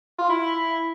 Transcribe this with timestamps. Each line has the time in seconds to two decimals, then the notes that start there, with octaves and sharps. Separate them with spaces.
0.19 F4
0.29 E4